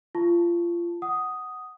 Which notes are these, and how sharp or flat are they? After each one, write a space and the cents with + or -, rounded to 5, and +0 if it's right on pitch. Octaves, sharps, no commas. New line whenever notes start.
F4 -25 A5 +0 C#6 +5
F#5 +5 D#6 +0